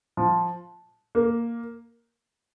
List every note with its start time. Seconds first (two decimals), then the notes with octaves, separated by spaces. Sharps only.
0.17 F3
1.15 A#3